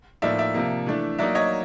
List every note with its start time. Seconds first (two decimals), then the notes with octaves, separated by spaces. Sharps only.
0.22 A2 F3 A#3 D#4 D5 E5
0.38 D5 E5
0.54 C3 F3 A#3
0.86 E3 A3 D4
1.19 F#3 A#3 D#4 D5 E5
1.35 C#5 D#5